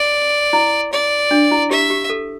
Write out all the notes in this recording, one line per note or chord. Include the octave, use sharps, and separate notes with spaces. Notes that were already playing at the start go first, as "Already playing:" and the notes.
Already playing: D5
E4
D5
D4
E4
G4 E5
G4
A4